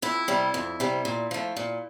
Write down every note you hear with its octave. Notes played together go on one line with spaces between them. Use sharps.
F2 E4
C3 G3
F2
C3 G3
A#2
F3 A3
A#2